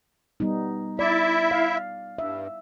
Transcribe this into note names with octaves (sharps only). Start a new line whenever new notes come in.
G3 B3 D#4
E4 D5 E5
F5
G2 E5